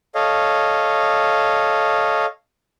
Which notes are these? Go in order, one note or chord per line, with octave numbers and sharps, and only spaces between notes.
A4 C#5 D#5 F5